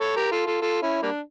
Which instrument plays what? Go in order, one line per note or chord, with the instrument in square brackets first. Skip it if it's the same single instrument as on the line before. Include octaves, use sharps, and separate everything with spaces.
[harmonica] A4 C#5
G4 A#4
F4 A4
F4 A4
F4 A4
C#4 E4
G3 A#3 D4